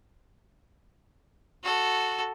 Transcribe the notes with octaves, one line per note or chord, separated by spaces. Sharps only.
F#4 A4